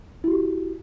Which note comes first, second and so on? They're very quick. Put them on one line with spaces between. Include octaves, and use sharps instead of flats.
E4 F#4 G4